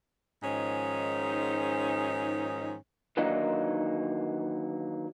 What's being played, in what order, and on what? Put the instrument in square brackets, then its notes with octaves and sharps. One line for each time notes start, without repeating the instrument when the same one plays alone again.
[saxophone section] G#2 D#3 F3 C#4 D#4
[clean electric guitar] D#3 E3 F#3 A#3 D4 D#4